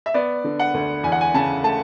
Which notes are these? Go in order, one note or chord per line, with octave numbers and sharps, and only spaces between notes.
E5
B3 D5
D3
F#5
D2
E2 G#5
F#5
G#5
C#3 A5
A3 A5